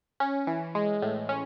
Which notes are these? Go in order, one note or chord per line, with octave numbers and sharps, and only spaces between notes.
C#4
E3
G#3
A2
C#4